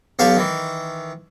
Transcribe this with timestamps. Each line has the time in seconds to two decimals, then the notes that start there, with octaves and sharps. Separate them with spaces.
0.19 B1 G4 F5 A5 C#6
0.37 D#3 E3